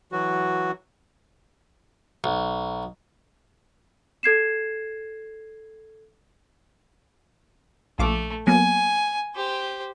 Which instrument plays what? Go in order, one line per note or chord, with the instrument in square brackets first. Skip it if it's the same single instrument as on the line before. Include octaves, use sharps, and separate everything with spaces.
[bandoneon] E3 F#3 F#4
[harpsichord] B1
[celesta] A4 G#6 C7 E7
[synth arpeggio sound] A#1 F5 D6 [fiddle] A3
[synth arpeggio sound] F#3 A#3 B3 [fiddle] G#5
[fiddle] G4 C5